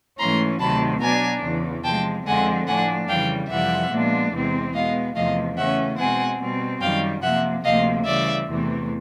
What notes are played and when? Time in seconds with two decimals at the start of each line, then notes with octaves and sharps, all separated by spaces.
0.19 G#2 E3 A3 C#4 A#5 C6
0.60 D2 C3 D#3 F#3 A5 B5
1.02 B2 F#3 B3 D4 G#5 A#5
1.43 E2 C#3 E3
1.85 C3 F3 G#3 G5 A5
2.26 F2 D3 F3 G#3 C4 F#5 G#5
2.67 A2 F3 A3 D4 F#5 G#5
3.09 F2 C#3 E3 G3 F5 G5
3.50 F2 C3 E3 G3 E5 F#5
3.92 A#2 F3 G#3 B3 D4
4.33 E2 C3 E3 G#3 C4
4.74 B2 G#3 B3 D#5 F5
5.16 E2 C3 F3 A3 D#5 F5
5.57 C#3 E3 A3 C#4 E5 F#5
5.98 B2 G#3 C4 F#5 G#5
6.41 B2 G3 C4
6.81 F#2 D#3 G3 F5 G5
7.23 C3 F3 A#3 E5 F#5
7.64 D2 C3 F3 A#3 D#5 F5
8.06 C#3 E3 G3 D5 E5
8.48 E2 C3 E3 A3